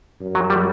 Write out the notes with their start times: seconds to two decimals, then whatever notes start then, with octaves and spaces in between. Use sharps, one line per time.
0.21 F#2
0.35 F#3
0.50 G3